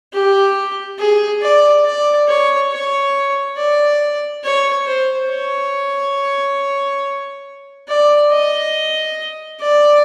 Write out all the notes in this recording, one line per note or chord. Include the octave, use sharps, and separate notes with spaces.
G4
G#4
D5
D5
C#5
C#5
D5
C#5
C5
C#5
D5
D#5
D5